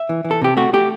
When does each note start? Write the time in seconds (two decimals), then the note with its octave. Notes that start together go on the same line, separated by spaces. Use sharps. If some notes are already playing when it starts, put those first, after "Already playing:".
Already playing: E5
0.09 E3
0.25 E3
0.31 A4
0.42 C3 G4
0.57 A3 F#4
0.73 A3 G4